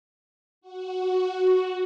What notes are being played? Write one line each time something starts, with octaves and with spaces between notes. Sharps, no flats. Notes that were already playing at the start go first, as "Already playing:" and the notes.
F#4